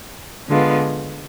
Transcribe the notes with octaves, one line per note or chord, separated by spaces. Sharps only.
D3 G#3 B3 F4